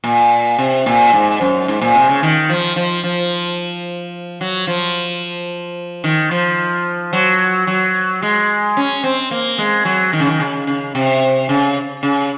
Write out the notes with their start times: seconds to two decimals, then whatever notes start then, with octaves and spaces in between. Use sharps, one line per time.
0.04 A#2
0.59 C3
0.86 A#2
1.13 G#2
1.41 F#2
1.68 G#2
1.81 A#2
1.95 C3
2.09 C#3
2.23 D#3
2.49 F3
2.76 F3
3.04 F3
4.41 F#3
4.67 F3
6.04 D#3
6.31 F3
7.13 F#3
7.67 F#3
8.22 G#3
8.77 C#4
9.04 C4
9.31 A#3
9.58 G#3
9.85 F#3
10.13 D#3
10.20 C#3
10.27 D#3
10.40 C#3
10.67 C#3
10.95 C3
11.49 C#3
12.03 C#3